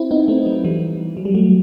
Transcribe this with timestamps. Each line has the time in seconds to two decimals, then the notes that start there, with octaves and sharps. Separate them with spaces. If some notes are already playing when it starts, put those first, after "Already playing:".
Already playing: C4 E4
0.11 B3 D#4
0.28 A3 C4
0.46 F#3 A3
0.64 E3 G3
1.17 F#3
1.25 G3
1.35 F#3 A3